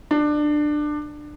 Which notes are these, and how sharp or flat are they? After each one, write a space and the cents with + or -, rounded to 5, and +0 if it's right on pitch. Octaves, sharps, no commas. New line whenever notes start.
D4 +20